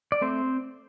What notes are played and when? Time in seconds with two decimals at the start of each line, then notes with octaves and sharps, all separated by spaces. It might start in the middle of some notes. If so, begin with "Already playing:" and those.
0.12 D5
0.21 A3 C4 C5